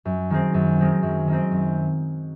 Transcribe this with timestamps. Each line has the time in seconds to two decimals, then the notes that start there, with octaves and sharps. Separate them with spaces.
0.05 F#2
0.30 D#3 G#3 C4
0.54 F#2
0.79 D#3 G#3 C4
1.03 F#2
1.28 D#3 G#3 C4
1.52 F#2